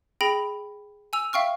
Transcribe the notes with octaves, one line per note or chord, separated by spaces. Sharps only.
G#4 G5 B5 A#6 D7
G#5 E6 F7
E5 F5 G5 C#6 F6